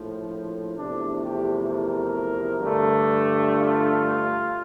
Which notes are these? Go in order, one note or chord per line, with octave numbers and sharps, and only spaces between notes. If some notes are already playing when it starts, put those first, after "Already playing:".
Already playing: A#1 A2 F3
E2 C3 F3 A3 D4
G4
A#4
G2 D3 A3
F4